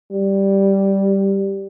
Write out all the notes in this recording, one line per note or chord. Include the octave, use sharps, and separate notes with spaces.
G3